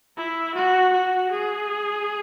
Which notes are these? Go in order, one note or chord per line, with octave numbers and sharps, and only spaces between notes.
E4
F#4
F#4
G#4